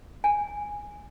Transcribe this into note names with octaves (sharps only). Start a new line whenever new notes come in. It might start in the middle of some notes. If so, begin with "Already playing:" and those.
G#5